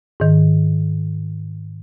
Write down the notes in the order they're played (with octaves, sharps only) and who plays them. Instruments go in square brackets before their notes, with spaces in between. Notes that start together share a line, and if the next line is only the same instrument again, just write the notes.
[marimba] G#2 D#3